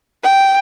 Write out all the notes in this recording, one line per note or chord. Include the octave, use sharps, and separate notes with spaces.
G5